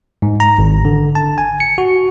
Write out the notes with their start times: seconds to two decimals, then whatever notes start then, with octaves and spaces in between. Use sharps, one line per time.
0.22 G#2
0.40 A#5
0.58 G#1
0.85 D3
1.15 A5
1.38 G#5
1.60 C#7
1.78 F#4